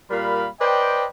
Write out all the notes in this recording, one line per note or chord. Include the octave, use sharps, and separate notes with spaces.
A#2 G3 A#4 F5 B5
B4 C5 D5 D#5 G5